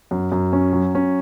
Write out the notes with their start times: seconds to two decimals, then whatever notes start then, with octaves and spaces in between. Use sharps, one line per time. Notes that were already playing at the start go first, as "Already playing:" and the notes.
0.11 F#2
0.32 F#2
0.53 C#4
0.73 F#3
0.95 C#4